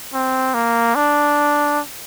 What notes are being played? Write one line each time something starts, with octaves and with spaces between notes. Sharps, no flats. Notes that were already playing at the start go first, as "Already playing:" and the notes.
C4
A#3
D4